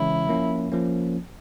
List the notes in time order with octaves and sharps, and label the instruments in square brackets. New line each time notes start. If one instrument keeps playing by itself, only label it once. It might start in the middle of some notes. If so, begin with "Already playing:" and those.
Already playing: [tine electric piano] C#3 E3 G#3 C#4 [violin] E4
[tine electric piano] F3 A#3 C#4
F3 A#3 C#4